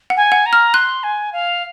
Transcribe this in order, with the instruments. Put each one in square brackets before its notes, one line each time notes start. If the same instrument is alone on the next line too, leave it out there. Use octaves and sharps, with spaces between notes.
[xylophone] F#5
[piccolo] G#5
[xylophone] F#5
[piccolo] A#5
[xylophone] F6
[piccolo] C6 [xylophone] F#6
[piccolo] G#5
F5